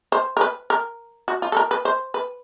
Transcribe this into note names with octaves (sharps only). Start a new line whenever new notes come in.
C5
A#4
B4
A#4
F#4
F4
A4
A#4
B4
C5
B4